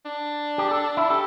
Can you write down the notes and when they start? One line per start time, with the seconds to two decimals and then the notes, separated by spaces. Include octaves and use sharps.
0.06 D4
0.58 G4
0.71 A4
0.97 E4
1.10 G4 A4